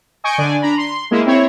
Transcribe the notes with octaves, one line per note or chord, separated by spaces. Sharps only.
D#5 G#5 C#6 G6 D7
D3 D4 D5 G#5
D4 A#5 B5
C6
G#3 A#3 E4
C4 E4 C#5